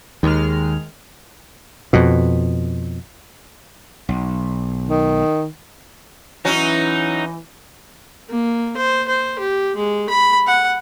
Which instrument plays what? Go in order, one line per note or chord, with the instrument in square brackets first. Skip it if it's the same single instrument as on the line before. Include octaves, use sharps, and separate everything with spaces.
[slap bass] D#2 [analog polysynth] D#3 G#3 F6
[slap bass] F2 B2
B1
[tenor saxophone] D#3
[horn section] E3 [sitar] F#3 C#4 F#4 [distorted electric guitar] D#4
[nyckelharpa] A#3
C5
C5
G4
G#3
B5
F#5